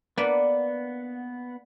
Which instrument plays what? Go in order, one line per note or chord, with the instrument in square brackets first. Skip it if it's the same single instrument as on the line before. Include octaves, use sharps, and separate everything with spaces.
[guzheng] A#3 D4 B4 [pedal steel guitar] B3 F#5